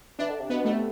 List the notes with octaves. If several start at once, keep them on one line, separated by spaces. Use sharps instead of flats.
E3 D4
D3
C3
B2 B3
B2
A3
C3